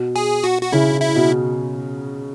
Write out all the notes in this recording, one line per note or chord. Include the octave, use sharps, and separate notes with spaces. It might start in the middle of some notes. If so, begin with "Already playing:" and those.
Already playing: B2
G#4
F#4
F#4
C#3 E4
E4
B2